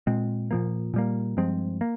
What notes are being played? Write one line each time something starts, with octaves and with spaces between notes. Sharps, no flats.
A#2 G#3 C4
A#2 F3 A#3
A#2 G3 A#3
G2 F3 G#3 C4
A#3